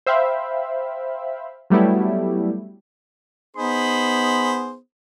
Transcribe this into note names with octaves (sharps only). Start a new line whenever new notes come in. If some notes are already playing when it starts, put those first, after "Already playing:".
C5 E5 F5 G5 B5
F#3 G3 A3 B3 E4 G4
B3 D#4 G#4 C5 B5